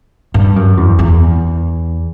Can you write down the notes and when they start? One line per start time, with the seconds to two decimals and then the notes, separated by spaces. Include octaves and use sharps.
0.34 G2
0.56 F#2
0.77 E2
0.99 E2